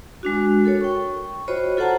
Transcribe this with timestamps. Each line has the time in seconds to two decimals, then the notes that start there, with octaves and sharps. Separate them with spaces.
0.23 G#3 D4 F#4
0.64 F#4 A4 A#4 C#5
0.81 G5 C#6
1.48 F4 F#4 C5 C#5 D#5 B5
1.77 F4 A4 C5 F#5 A5 A#5